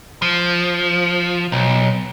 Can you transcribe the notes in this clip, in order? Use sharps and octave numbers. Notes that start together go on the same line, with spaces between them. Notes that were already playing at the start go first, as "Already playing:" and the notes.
F3
B1